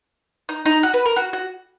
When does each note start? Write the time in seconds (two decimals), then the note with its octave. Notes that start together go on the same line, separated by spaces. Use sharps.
0.49 D#4
0.66 D#4
0.83 F#4
0.94 B4
1.06 A#4
1.16 F#4
1.33 F#4